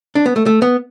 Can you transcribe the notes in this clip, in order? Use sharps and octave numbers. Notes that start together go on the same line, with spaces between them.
D4
B3
A3
A3
B3